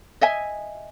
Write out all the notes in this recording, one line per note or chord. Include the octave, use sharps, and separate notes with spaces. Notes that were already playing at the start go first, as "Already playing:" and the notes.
D#5 E5 G#5